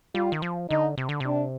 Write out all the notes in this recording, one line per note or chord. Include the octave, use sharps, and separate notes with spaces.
G3 F4
D#3
F3
D3 D#4
C3
D3
C3 D4